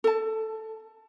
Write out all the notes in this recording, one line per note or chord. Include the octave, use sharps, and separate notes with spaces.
A4 A5